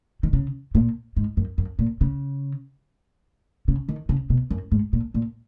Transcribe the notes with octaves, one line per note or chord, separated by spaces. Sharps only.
D#3
C#3
A#2
G#2
F#2
F#2
A#2
C#3
C#3
D#3
C#3
B2
F#2
G#2
A#2
A#2